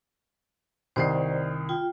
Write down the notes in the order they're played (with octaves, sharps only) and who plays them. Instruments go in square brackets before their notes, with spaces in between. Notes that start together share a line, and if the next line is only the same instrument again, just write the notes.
[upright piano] C2 D#3 C7 [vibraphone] C5 D5
[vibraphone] F4 G5